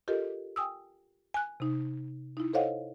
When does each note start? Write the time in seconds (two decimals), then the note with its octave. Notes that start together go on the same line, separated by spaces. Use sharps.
0.08 F4 G4 A4 A#4 D#5
0.56 G5 G#5 D#6 E6
1.34 G#5 F#6
1.60 C3 D#4
2.37 D#4 E4
2.53 A4 C5 C#5 D#5 F5 F#5